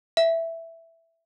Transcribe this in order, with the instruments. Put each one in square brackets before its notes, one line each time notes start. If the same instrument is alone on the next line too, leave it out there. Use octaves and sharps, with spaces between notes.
[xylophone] E5